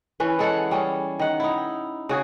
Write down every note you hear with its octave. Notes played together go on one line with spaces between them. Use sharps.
E3 C#4 B4
G#3 A4 C#5 F#5
G3 C#4 G#4
D#3 F#5
D#4 E4
C#3 F#4 G#4